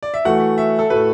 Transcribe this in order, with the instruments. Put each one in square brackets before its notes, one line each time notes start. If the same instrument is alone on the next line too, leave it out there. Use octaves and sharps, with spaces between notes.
[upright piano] D5
E5
[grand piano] E3 A3 F#4 [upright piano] F#5
[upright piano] E5
A4
[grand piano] A2 A3 F#4 [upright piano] B4